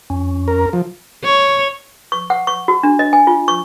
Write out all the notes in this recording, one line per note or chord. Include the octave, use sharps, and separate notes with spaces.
F2 C#4
A#4
F3
C#5
C#6
F#5
C#6
F#4
D4
D#5
G#5
F4
C#6